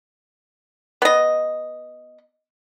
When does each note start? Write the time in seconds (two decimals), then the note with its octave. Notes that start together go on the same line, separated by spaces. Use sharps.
1.02 B3 D#5